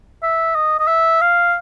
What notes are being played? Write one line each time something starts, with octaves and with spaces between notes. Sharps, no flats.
E5
D#5
D#5
E5
F5